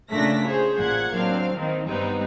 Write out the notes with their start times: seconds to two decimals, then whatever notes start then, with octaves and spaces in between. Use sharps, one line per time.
0.12 A#2 C#3 A3 D4 A#6 B6
0.47 G#4 C5 C#5
0.79 A1 A#2 F#5 G#6
1.13 F#3 A#3 C4 D4 F5
1.55 D#3 C4 D#4
1.87 G2 G3 B3 C4 D#4